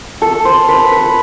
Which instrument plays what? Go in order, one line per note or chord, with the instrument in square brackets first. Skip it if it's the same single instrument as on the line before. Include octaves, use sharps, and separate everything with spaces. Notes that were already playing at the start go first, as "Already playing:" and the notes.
[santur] A4
C5
B4
B4
B4